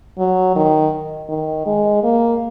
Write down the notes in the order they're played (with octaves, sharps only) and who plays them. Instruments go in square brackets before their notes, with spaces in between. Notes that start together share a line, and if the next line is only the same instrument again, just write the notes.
[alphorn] F#3
D#3
D#3
G#3
A#3